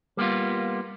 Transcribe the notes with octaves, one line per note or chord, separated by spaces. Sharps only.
G3 A#3 B3 F4